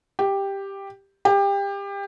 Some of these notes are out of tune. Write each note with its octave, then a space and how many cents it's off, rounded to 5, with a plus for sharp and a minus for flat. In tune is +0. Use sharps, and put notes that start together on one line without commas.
G4 +5
G4 +25